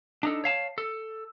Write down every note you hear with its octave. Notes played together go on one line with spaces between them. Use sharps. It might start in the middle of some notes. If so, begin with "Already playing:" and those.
D4 D#4 A4
C#5 F5 A5
A4